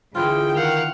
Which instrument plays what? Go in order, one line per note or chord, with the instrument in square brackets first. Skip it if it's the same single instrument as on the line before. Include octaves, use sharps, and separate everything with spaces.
[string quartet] D3 G5 [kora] E3 E4 F4 [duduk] G#4
[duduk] D#3 [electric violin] F5 F#5